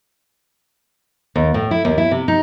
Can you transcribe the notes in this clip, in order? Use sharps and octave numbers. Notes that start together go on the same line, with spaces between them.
D#2
A2
E4
D#2
E4
C3
D#4